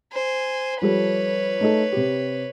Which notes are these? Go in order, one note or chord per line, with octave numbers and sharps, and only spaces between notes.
C5 G#5
F3 G3 A4 B4 C#5
A3 D#4 A4
C3 G4